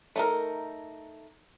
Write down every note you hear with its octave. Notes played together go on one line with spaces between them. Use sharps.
A3 D#4 A#4